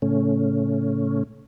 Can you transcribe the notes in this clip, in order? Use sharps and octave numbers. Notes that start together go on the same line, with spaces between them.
A2 C#3 A3 C#4